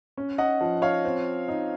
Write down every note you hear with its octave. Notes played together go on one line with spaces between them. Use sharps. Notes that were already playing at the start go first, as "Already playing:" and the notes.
C#4
D#5 F#5
F3
C#5 F5
C4
D#4